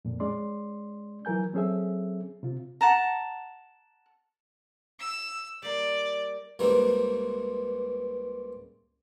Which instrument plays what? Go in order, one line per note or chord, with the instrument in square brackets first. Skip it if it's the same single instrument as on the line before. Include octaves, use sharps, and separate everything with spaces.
[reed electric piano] F2 A#2
G#3 C#4 D5 C6
E3 F#3 A#4 G#5 G6
F#3 C4 C#4 G#4 A4 E5
C3 F4
[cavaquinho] F#5 A5 A#5
[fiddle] E6
[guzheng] G3 A#3 [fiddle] D5
[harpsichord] C#2 E3 G3 A#3 C4